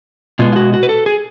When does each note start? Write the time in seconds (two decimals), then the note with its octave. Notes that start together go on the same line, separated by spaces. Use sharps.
0.39 B2 G#3 B3 F4
0.53 F4
0.56 F#4
0.74 F#4
0.83 B4
0.89 A4
1.06 G#4